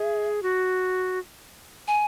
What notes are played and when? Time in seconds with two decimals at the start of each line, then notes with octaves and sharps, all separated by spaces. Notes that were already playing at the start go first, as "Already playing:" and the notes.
Already playing: G#4 E5
0.43 F#4
1.88 G#5